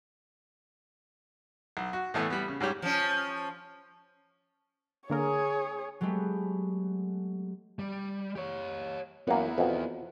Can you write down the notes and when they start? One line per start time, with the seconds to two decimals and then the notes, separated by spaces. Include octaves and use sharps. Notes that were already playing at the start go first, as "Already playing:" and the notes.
1.77 B1
1.93 F#4
2.14 A2 E3 A3 B3
2.30 G3 B3
2.48 C#3
2.61 G#2 G3 C#4 G4
2.82 F3 C#4
5.10 D3 A#3 G#4 A#4 C#5
6.01 F#3 G#3 A3 B3 G4
7.79 G3
8.36 G4 C#5
9.28 F#2 A#3 B3 E4
9.58 F2 B2